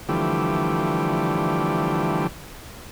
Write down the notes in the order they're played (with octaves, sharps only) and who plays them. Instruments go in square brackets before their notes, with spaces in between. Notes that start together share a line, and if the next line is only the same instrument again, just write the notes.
[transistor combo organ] D3 E3 F3 G3 A3 G4